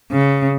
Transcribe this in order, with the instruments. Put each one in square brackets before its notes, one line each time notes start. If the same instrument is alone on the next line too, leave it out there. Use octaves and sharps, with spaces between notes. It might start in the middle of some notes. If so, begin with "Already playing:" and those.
[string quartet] C#3